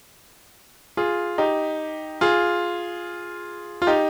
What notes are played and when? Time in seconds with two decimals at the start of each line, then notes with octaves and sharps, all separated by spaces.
0.97 F4 G#4
1.38 D#4 G4
2.21 F4 G#4
3.82 F4
3.87 D#4 G4